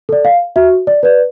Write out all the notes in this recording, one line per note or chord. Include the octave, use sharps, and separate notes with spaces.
A4 D5
F5
F#4 E5
D5
B4 D5